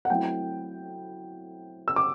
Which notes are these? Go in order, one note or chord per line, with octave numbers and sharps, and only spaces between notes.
F#5
F#3 A3 C4 E4 G5
E6
D6